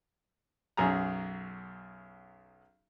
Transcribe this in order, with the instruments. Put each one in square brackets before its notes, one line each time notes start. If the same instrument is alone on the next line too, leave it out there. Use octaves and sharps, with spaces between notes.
[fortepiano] B1 F#2 G#4 A#5